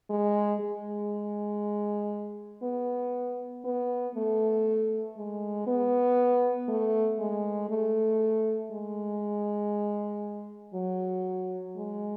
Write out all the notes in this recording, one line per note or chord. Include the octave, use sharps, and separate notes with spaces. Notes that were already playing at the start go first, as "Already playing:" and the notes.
G#3
G#3
B3
B3
A3
G#3
B3
A3
G#3
A3
G#3
F#3
G#3